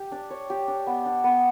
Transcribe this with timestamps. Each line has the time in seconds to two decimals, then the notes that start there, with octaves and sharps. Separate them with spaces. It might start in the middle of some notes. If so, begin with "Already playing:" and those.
Already playing: G4
0.12 D4
0.30 C#5
0.50 G4
0.68 D4
0.87 B3
1.06 D4
1.24 B3